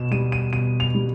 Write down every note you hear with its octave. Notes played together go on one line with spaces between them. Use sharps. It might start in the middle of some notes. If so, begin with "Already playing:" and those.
Already playing: B2 E7
G3 D#7
D#7
B2 D#7
F7
G3